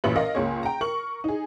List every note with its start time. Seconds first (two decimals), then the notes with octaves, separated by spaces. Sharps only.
0.04 A1 A#2 B4 E5 F#7
0.16 A#4 D#5 F5
0.35 C#2 A#3 G#4 C#5
0.63 G5 A#5
0.81 A#4 C#6 F#7
1.24 D#4 G#4